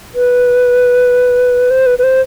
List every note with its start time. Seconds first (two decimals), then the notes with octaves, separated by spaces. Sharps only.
0.15 B4
1.71 C5
1.86 B4
1.99 B4
2.03 C5